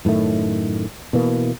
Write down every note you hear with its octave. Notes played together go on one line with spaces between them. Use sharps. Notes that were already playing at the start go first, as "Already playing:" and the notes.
F#2 A2 D#3 A3
B2 E3 A#3